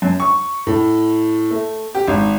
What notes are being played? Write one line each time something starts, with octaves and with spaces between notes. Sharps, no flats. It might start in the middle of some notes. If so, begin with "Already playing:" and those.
F#2
C#6
A2
A3
G4
G#1